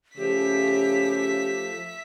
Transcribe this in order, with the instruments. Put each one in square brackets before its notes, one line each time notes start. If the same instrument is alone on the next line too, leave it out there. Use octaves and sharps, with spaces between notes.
[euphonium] C#3 [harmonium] F3 A3 [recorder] G4 [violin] E5 B6